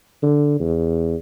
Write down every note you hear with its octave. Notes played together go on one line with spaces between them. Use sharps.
D3
E2